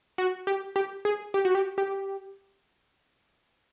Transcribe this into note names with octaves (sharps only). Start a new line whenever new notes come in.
F#4
G4
G4
G#4
G4
F#4
G4
G4